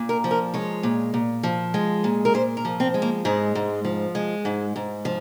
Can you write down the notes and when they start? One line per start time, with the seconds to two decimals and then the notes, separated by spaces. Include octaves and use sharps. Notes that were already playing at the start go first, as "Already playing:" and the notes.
Already playing: A#2
0.09 A#4
0.24 F3
0.31 A#4
0.54 G#3 C#5
0.83 A#2
1.14 A#2
1.43 F3
1.74 G#3
2.04 A#2
2.25 A#4
2.34 A#2 C5
2.57 A#4
2.65 F3
2.80 C4
2.94 G#3
3.02 A#3
3.25 G#2 G#3
3.55 G#2
3.85 F3
4.15 G#3
4.45 G#2
4.76 G#2
5.05 F3